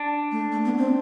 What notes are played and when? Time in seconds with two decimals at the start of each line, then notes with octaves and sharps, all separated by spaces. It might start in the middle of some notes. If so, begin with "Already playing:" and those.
Already playing: D4
0.32 A3
0.52 A3
0.65 B3
0.78 C4